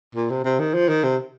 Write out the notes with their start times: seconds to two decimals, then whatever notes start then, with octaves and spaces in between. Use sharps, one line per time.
0.15 A#2
0.30 C3
0.44 C3
0.60 D#3
0.74 F3
0.89 D#3
1.04 C3